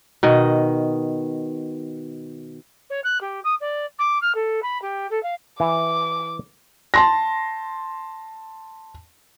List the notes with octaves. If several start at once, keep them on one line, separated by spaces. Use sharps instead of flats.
B2 D#3 D#5
C#5
F#6
G4
D#6
D5
D6
F6
A4
B5
G4
A4
F5
E3 D6
A5 C6 A#6